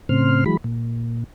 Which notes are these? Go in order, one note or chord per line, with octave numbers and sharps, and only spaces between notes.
A2 C#3 C4 C6 F6
E3 F#3 G#3 B5
A#2